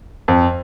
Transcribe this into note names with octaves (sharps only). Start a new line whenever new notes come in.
F2